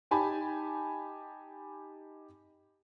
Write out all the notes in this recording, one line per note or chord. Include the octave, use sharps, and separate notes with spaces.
D#4 G4 G#5 A5 B5